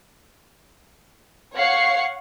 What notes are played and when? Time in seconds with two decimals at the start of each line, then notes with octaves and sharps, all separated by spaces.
1.57 C#5 F5 F#5 C#6 C7 C#7